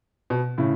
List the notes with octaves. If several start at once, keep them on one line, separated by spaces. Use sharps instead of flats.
B2
A2 C#3